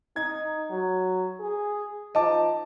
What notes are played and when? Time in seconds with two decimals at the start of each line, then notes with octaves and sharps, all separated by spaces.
0.16 D#4 G#6
0.70 F#3
1.40 G#4
2.15 F3 D#4 D#5 A5 D6